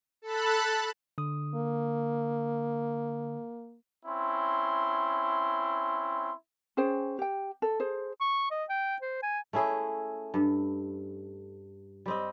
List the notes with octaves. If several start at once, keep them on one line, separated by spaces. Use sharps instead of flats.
A4 A5 B5 F#6
D3 D#6
A#3
C4 C#4 E4 C6
C#4 G#4 C5 G5
G4 G5
A4
G#4 C5
C#6
D#5
G5
C5
G#5
A3 C#4 E4 G#4
G2
G3 C4 D#5